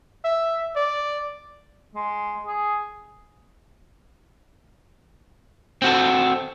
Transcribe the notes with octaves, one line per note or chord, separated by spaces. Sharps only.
E5
D5
G#3
G#4
C4 F#4 A4